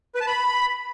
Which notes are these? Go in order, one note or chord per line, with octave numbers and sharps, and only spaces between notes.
B4
A5
B5